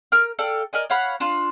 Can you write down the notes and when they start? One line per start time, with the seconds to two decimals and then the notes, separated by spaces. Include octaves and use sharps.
0.12 A#4 F6
0.39 A4 D5 F5 G5
0.73 A#4 D5 D#5 G#5
0.90 C#5 F5 F#5 B5
1.20 D4 F4